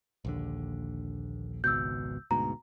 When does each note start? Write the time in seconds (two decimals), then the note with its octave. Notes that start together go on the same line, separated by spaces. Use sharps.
0.25 A#1 D#2 D3
1.64 G#1 C#2 B2 E6 G6
2.31 D2 G#2 B2 A#5